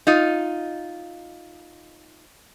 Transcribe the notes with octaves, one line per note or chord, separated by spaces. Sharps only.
D#4 F4 D#5